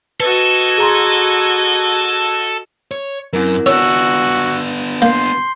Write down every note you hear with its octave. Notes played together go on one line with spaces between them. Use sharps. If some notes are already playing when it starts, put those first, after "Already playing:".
F#4 A4 B4 D#5 G#6
G#4 A#5 C6
C#5
F#2 C4 E4 A#4
B3 D4 F#4 C#5 E6
A#3 C6 G6 C7